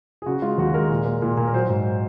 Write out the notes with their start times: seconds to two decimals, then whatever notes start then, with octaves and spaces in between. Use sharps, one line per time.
0.22 G#4
0.26 C#3 F#4
0.42 G#3 F4
0.58 D#2 F#4
0.74 G#3 A#4
0.90 A#2
1.05 A#3
1.22 A#2
1.37 A#2
1.47 A#4
1.53 F#3 C5
1.69 G#2